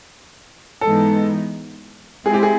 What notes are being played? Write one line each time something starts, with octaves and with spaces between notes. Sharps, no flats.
G#2 E3 G#3 B3 D#4 A4
G#3 C4 E4 G#4
G4
G#4